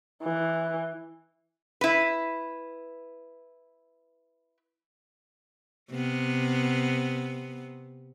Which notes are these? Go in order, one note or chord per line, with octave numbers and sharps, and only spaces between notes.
E3
E4 B4
C3 B3